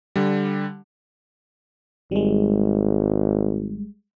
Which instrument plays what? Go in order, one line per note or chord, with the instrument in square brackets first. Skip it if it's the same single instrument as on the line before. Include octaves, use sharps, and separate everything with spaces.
[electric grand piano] D3 G3
[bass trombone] G#1 [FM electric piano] G3 G#3